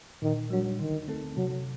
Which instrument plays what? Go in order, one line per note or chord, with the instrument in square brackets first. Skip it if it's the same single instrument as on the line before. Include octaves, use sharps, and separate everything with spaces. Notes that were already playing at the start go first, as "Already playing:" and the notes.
[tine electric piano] A#2 [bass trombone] D#3
[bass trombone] F#3 [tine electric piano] G3 D4
[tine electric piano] D3 [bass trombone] D#3
[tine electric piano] A3 C4 D#4 A4
[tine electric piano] C3 [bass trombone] F#3